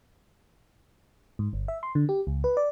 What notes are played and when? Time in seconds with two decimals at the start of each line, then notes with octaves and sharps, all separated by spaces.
1.39 G#2
1.53 G1
1.68 E5
1.83 C6
1.95 D3
2.09 G4
2.27 C#2
2.44 B4
2.57 D5